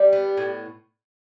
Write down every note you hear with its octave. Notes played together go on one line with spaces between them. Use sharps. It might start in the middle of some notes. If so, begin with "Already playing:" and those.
Already playing: G3
B3
A2